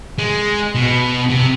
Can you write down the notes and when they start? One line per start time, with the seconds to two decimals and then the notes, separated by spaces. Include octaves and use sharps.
0.18 G#3
0.75 B2
1.30 C3